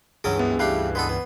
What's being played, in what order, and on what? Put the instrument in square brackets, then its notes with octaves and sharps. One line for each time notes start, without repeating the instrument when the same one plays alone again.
[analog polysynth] C#2 G2 E3 [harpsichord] F#3 C#4 D#5 [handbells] G#4
[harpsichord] F#2 [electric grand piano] B3
[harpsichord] G3 A3 G4 [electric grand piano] F5 F#6 C7
[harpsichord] G#3 B3 A4 [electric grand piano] B4
[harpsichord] B3